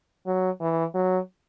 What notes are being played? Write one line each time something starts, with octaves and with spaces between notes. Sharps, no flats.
F#3
E3
F#3